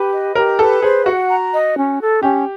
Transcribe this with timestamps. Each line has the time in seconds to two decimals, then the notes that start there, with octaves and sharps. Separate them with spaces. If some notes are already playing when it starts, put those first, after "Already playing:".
Already playing: G4 B4
0.12 D#5
0.35 G4 A#4
0.59 A4 B4
0.82 G#4 C5
1.06 F#4 F#5
1.29 A#5
1.53 D#5
1.76 C#4
2.00 A4
2.23 C#4 G4